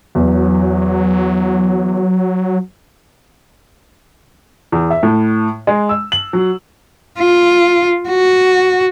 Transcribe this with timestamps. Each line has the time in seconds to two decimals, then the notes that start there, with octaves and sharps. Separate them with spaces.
0.15 E2 F#3
4.72 E2
4.90 E5
5.03 A2
5.67 G#3
5.89 E6
6.12 F#7
6.33 F#3
7.19 F4
8.09 F#4